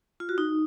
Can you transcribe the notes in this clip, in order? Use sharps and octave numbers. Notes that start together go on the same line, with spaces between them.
F4
F#4
D#4